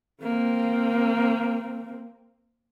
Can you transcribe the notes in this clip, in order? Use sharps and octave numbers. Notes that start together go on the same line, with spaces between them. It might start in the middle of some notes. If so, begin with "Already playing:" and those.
A#3 C4